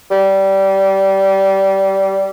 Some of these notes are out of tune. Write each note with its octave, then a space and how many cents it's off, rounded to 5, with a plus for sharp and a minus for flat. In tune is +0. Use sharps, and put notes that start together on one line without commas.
G3 -20